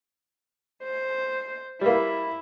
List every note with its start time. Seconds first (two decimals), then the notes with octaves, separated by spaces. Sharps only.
0.83 C5
1.81 G3 A#3 E4